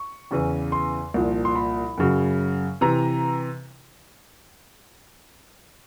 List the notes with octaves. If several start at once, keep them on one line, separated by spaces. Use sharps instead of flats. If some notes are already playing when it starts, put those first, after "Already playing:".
Already playing: C#6
E2 C#3 E3
C6
C2 A#2 F3
C6
B5
F#2 C#3 F#3
C3 E3 A#5